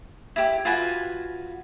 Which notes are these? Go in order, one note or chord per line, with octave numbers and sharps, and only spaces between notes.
E4 G4
F4 F#4 B4 G#5